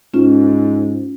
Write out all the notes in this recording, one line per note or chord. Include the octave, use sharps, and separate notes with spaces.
G#2 C#4 F4